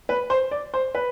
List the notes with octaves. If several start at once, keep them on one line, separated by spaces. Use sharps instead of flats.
B4
C5
D5
C5
B4